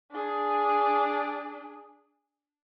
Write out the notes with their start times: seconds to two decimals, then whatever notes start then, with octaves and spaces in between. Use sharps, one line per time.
0.12 D4 G#4